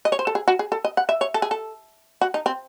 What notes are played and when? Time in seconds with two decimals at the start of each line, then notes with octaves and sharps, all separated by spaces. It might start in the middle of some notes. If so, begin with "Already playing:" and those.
0.05 D#5
0.12 C#5
0.19 C5
0.27 A4
0.35 G#4
0.48 F#4
0.59 G#4
0.72 A4
0.85 D#5
0.97 F#5
1.09 E5
1.21 C#5
1.34 A4
1.42 G#4
1.51 A4
2.21 F#4
2.34 D#4
2.46 C4